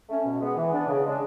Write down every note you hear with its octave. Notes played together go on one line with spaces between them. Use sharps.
A3 C#4
B2
G#3 B3
E3
B3 D4
C#3
G#3 D4